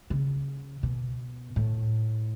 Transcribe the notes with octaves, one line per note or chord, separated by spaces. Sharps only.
C#3
B2
A2